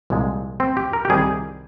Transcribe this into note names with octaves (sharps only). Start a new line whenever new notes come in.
C2 A#2 F3 G#3
C4
G4
A#4
G4
C2 C3 D#3 G3 G#4